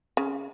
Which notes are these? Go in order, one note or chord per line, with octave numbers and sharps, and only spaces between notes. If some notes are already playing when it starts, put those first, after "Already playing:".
C#3